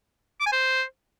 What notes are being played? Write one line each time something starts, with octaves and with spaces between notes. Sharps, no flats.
D6
G#5
C5